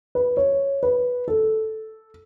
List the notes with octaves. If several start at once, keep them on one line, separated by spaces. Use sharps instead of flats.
B4
C#5
B4
A4